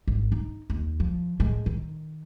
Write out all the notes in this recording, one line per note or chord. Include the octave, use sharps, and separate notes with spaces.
G#1
D#4
D#2
F3
A2 G#3
D#3